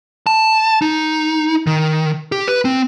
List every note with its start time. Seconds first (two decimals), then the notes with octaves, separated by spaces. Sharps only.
0.27 A5
0.82 D#4
1.67 D#3
2.32 G4
2.47 B4
2.65 C4